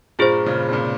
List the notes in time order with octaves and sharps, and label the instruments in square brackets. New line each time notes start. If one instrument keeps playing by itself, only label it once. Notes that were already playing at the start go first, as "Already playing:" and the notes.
[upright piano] G2 A#2 [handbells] F4 G#4 C5
[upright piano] A#2 C#3
C3
G2 A#2